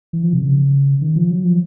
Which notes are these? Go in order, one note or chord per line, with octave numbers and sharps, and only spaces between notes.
E3
F3
C3
C#3
D#3
F3
F#3
F3